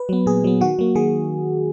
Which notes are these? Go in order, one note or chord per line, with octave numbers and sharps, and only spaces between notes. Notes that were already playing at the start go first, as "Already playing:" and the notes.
Already playing: B4
F#3 B3
A#2 G#4
F#3 B3
D#3 F#4
F#3 A#3
D#3 G#4